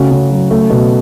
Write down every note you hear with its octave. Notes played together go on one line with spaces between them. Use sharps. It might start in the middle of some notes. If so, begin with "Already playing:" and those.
Already playing: C#3 A3 F#4
C#3
F#3
A3
B2